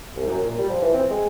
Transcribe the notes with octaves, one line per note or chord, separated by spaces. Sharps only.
C2
F#2
A#2
G3
F3
E3
C4
G#3